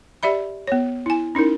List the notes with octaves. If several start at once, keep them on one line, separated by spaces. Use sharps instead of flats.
G4 D5 E5 B5
B3 C#5
E4 G#5
C#4 D#4 E4 A#4